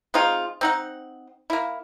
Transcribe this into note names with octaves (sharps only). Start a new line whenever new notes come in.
G#3 C4 D#4 F4
C4 D#4 F#5
A#3 E4